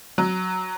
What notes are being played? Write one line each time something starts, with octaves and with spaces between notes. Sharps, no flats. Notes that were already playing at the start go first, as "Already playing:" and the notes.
F#3